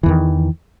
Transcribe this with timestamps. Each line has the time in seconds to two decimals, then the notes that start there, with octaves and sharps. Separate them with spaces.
0.03 E3
0.06 E2
0.08 D#3